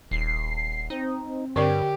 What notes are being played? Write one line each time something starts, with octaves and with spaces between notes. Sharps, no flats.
D#1 C7
C4 D#4
G2 D3 G4 A#4 D5